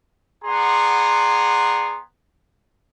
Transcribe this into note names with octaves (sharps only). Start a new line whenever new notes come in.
B3 G#4 D5 F#5 A#5 C6